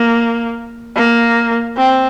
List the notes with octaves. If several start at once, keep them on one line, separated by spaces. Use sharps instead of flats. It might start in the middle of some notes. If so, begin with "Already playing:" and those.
Already playing: A#3
A#3
C4